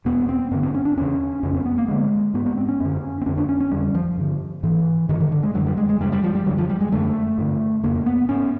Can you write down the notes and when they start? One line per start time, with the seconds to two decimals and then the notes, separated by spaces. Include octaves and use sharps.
0.05 E2 B2 B3
0.29 C4
0.51 G2 D3 B3
0.63 C4
0.74 C#4
0.85 D4
0.97 E2 C#3 C#4
1.43 F2 C#3 C#4
1.55 C4
1.66 B3
1.78 A#3
1.88 G2 D3 G#3
2.34 G#2 B3
2.46 B3
2.57 C4
2.68 C#4
2.80 F#2 D3
3.21 C4
3.26 F2 D3 C#4
3.37 D4
3.49 C#4
3.60 C#4
3.72 F2 D3 G3
3.95 F3
4.17 G2 D3
4.63 G#2 E3
5.09 G2 D3 D#3
5.20 D#3
5.32 D3
5.43 G#3
5.54 F#2 D3 F#3
5.66 G3
5.77 G#3
5.89 G#3
6.00 F#2 G3
6.04 C#3
6.12 G3
6.24 F3
6.35 G3
6.46 F#2 D3 F#3
6.58 F3
6.69 G3
6.81 G#3
6.92 F#2 D3 A3
7.38 G2 D3
7.83 F2 C#3 A#3
8.06 B3
8.29 G#2 C#4